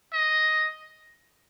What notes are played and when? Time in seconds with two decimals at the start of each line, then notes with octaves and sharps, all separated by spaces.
0.13 D#5